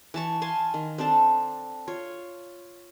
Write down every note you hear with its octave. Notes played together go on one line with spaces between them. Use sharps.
E3 A5 C#6
F5 G#5 A5 C6
D#3
C4 D4 A4 A5
F4 C#5